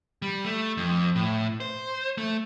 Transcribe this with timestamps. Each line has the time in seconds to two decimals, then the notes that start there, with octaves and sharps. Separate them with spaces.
0.22 G3
0.45 A3
0.77 F2
1.15 A2
1.60 C5
2.18 A3